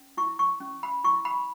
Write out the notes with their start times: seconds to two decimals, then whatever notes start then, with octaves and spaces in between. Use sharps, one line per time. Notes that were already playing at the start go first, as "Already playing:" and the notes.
Already playing: C#4
0.17 E4 C#6
0.39 C#6
0.60 C#4
0.83 B5
1.04 E4 C#6
1.25 B5